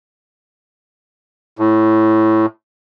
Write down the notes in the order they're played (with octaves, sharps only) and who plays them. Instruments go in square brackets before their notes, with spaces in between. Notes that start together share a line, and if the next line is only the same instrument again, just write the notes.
[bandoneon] A2